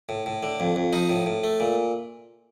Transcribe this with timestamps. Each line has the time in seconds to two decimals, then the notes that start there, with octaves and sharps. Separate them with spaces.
0.09 A2
0.26 A2
0.43 D3
0.60 F2
0.76 F2
0.93 F3 D#4
1.10 A2
1.26 A2
1.44 A3
1.60 A#2